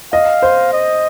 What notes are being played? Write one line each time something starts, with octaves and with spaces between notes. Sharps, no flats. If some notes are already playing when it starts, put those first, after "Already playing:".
D#5 F5
C5
D#5